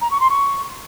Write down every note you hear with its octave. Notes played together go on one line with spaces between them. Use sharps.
A#5
C#6
C6
C#6